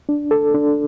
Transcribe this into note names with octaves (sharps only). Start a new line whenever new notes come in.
D4
A4
D4